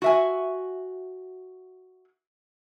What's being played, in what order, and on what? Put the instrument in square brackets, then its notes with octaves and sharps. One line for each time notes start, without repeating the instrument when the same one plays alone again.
[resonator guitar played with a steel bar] F#4 E5 G#5